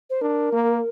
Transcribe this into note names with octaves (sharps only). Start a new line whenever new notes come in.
C5
D4 A#4
A#3